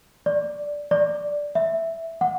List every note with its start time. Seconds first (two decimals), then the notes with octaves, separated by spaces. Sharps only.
0.26 D5
0.91 D5
1.55 E5
2.21 F#5